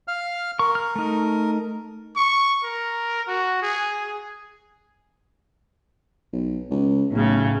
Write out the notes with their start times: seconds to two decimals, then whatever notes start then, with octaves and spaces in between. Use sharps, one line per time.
0.08 F5 F6
0.59 A#4 C#6
0.75 F6
0.96 A3 D#4
2.16 C#6
2.63 A#4
3.28 F#4
3.62 G#4
6.33 B1
6.71 C#2
7.11 B1 A2 C#3